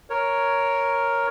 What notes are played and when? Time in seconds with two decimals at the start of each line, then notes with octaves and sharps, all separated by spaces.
0.10 A#4 C#5